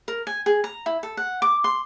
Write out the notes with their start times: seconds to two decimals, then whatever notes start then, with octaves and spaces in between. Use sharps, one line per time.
0.08 A#4
0.27 G#5
0.46 G#4
0.64 A#5
0.86 E4
1.03 A4
1.17 F#5
1.42 D6
1.64 C6